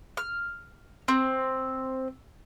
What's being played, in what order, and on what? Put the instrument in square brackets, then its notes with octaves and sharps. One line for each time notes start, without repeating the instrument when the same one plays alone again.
[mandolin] F6
C4